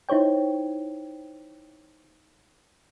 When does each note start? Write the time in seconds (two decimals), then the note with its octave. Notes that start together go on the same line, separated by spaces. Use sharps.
0.09 D#4 E4 C5 C#5 G5